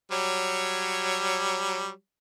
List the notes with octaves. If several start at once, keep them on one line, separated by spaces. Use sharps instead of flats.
F#3 G3 C#5